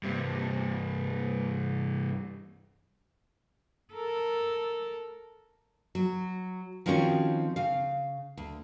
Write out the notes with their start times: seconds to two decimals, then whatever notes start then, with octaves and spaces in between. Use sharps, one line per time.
0.03 G2 C3
3.93 A4 A#4
5.95 F#3
6.86 D#3 F3 C4 C#4 F#4 C#5
7.56 C#3 F5
8.37 D2